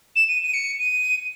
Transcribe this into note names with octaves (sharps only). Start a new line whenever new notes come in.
E7
D#7
D#7
C#7
D#7